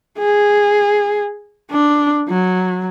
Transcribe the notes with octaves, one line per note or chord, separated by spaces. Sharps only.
G#4
D4
F#3